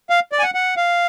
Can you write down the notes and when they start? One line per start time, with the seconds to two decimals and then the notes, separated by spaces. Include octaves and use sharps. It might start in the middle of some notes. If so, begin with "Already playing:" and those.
0.10 F5
0.32 D5
0.39 G#5
0.43 F#5
0.55 F#5
0.77 F5